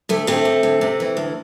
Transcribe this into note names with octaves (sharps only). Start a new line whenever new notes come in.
D2 A3
D2 A3 C4
D2
D2
C3
E3
D2